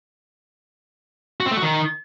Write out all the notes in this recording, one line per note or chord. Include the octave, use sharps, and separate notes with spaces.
F#4
C4
A3
F#4
D#3